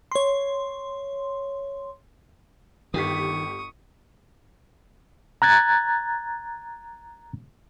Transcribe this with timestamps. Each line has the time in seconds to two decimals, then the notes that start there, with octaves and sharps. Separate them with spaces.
0.12 C#5 C6
2.94 G1 D#3 G4 C#6 D#6 B6
5.42 A#5 F#6 G#6 A6